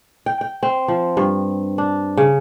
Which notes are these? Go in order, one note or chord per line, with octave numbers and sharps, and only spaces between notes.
G5
G5
C4
F3
G2
D4
C#3